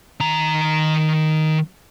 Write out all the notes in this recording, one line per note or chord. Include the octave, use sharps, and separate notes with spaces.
D#3 A#5